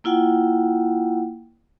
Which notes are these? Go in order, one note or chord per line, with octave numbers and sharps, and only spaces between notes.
A#3 E4 F4 F#5 G5